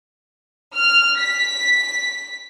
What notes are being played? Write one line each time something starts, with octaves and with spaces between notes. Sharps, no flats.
F6
B6